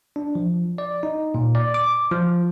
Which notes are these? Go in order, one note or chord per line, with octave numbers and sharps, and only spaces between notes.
D4
F3
D5
D#4
A#2
D5
D6
F3